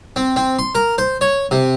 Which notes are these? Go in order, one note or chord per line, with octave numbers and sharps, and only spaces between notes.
C4
C4
C6
A#4
C5
C#5
C3